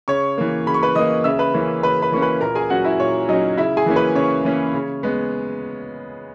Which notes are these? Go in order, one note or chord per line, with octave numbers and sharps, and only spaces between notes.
C#3 C#5 C#6
E3 A#3
C#3 B5
C#6
B4 B5
E3 A#3 D#5 D#6
C#3 E5 E6
B4 B5
E3 A#3 C#4
C#3 B4 B5
B4 B5
E3 A#3 C#4 C#6
B4 B5
A#2 A#4 A#5
G#4 G#5
F#3 C#4 F#4 F#5
E4 E5
A#2 C#5
F#3 C#4 D#4 D#5
C#3 E4 E5
G#4 G#5
E3 A#3 C#4
B4 B5
C#3 C#5 C#6
E3 A#3 C#4
C#3
G#3 B3